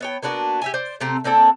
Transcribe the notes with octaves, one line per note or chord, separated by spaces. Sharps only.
B3 C#5 G5
A#3 B3 D4 F#4
G4 E5 G#5
C5 D5
C3 A3 C4 A#5
A#3 C4 D4 A4